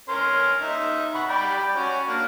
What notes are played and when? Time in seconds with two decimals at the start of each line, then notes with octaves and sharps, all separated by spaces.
0.09 C#4 A#4 C6
0.62 D#4 E5
1.15 F#5 B5 C#6
1.29 D5 G5 B5
1.76 C#4 F#4 C#6
2.08 A#3 D4